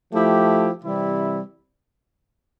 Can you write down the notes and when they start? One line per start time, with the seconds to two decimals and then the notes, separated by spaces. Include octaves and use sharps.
0.12 F3 A3 E4 G4
0.84 C3 E3 G3 C4 E4